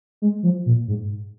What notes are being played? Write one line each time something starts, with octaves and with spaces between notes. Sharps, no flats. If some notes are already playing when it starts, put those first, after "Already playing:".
G#3
F3
A#2
G#2